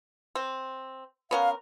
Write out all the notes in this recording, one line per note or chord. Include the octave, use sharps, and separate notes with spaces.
C4
B3 C#4 A#4 F5